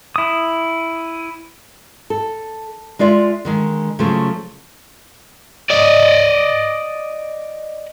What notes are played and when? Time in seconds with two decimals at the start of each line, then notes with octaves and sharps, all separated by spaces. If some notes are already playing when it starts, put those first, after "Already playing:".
0.16 E4 D#6
2.10 A4
2.99 G#3 F4 D5 E5
3.45 D3 D#3 G#3
3.99 C#3 F3 F#3 A3 C#4
5.70 D5 D#5